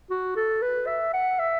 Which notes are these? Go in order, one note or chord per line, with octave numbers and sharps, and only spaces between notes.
F#4
A4
B4
E5
F#5
E5